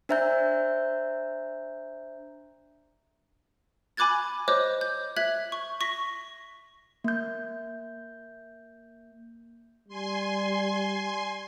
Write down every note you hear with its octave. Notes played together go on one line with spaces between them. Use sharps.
D4 C5 E5 A#5 G6
G#5 B5 D6 F#6 G#6 A6
C5 C#5 D#5 D6 F#6 G6
G6
E5 F#6 G#6 B6 F#7
C#6
C#6 A#6 B6
A#3 G6
G3 G#5 C6